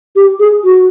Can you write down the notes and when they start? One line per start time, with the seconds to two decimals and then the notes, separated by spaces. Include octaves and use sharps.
0.16 G4
0.40 G#4
0.64 F#4